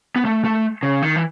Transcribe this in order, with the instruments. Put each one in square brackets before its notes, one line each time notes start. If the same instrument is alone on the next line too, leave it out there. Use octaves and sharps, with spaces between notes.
[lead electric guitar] B3
A3
A3
C#3
D#3
E3